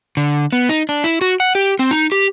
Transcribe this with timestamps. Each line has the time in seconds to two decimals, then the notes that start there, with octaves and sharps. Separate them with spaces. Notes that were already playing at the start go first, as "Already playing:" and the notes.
0.17 D3
0.52 B3
0.69 D#4
0.89 D4
1.04 E4
1.21 F#4
1.40 F#5
1.55 G4
1.79 C4
1.91 D#4
2.12 G4